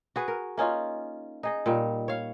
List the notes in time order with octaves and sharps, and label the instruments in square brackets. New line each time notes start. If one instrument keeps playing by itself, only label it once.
[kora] F#4 G#4 B4
A#4
A#3 C#4 D#4 F4
D#4 G#4 D#5
A#2 G3 D#4
C#5 F5